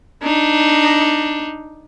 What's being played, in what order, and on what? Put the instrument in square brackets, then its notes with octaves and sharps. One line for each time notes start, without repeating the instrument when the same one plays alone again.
[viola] D4 D#4